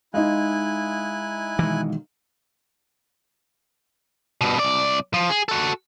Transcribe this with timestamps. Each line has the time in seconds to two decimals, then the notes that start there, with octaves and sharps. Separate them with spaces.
0.14 G#3 D#4 E4 D#5 F5 G#5 F#6
1.59 B1 D#3 E3 G#3
4.41 G2 B2
4.57 C2 D5
5.14 F3
5.30 G#4
5.49 F#4 A4